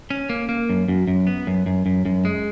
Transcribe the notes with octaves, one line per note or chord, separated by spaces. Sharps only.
C#4
A#3
A#3
F#2
F#2
F#2
B3
F#2
F#2
F#2
F#2
G#3